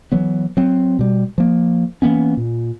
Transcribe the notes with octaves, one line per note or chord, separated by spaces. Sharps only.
E3 F#3 B3
F#3 C4
B2 G3
F3 A#3
E3 A#3 B3 C#4
A#2